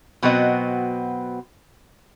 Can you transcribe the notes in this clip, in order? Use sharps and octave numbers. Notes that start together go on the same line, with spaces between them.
B2 F#3 B3 C4 F#4 D#5